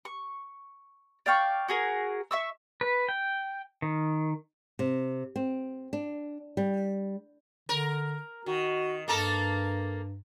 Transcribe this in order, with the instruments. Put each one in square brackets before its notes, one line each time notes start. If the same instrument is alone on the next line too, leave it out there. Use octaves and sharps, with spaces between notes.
[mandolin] C#6
D5 F5 G5 C#6
F#4 G#4 A#4
E5 C#6 E6
[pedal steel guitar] B4
G5
D#3
[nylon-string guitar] C3
C4
D4
G3
[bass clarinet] D3 [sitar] A#4
[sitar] D#3 [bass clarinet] F#4
[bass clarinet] G2 [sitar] A#3 A4 A#4